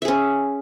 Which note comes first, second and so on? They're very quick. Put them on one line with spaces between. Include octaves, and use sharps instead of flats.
E5 G#4 C#4